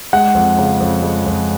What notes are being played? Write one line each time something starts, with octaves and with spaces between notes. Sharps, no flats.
G#3 F#5
F2
C#3
F2
G#3
F2